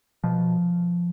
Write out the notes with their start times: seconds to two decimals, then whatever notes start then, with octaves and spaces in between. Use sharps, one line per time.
0.24 B2 F3